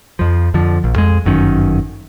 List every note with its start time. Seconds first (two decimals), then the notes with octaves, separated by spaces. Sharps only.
0.19 F2 F3
0.54 F2 D3 F3
0.84 A#1
0.96 F2 G#3
1.25 G1 F#2 D#3 C#4